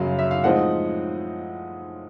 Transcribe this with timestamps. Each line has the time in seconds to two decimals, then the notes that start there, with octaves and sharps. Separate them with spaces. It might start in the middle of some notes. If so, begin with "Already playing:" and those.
Already playing: F#2 C#3 F#3 F5
0.19 E5
0.31 F5
0.44 A2 F3 G#3 C4 D#4 F#5